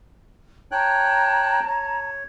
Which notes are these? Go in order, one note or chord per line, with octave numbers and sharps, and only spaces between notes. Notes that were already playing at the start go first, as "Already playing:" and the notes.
C#5 G5 A5 A#5 F#6
C#5